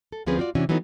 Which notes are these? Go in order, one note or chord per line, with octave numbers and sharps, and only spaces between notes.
A4
D2 F3 C4 C#4 G#4 B4
F4 F#4 D5
C3 E3 C#4 D4 F#4
E3 F#3 A3 B3 D#4